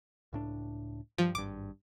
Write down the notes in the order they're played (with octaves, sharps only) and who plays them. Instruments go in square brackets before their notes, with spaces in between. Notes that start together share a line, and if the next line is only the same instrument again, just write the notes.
[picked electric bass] C#2 A2 D4
[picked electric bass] G2 [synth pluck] F3
[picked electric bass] G#1 G2 [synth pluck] D6